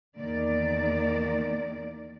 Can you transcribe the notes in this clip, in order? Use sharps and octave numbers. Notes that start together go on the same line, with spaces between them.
E2 D#3 A#3 D5